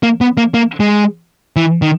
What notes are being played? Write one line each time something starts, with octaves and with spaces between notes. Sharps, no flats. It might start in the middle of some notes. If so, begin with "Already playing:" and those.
A#3
B3
A#3
A#3
G#3
E3
D#3